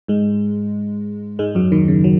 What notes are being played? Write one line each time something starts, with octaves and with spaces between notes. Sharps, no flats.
G#2 G#3
G#2 G#3
F#2 F#3
D#2 D#3
C#3
F#3